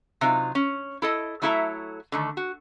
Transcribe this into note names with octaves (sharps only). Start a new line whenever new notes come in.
C3 F#3 D#4 F4
C#4
E4 A4 D#5
F#3 A3 E4 A4 E5 A#5
D3 D#3 A3
F#4